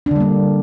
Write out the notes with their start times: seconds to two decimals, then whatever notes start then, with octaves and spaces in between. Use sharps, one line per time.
0.06 D4
0.11 D3
0.16 G3
0.20 A#3